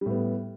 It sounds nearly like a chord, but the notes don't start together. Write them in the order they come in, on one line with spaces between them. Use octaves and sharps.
G3 A2 B3